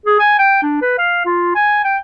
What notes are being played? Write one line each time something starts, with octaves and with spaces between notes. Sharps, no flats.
G#4
G#5
G5
D4
B4
F5
F4
G#5
G5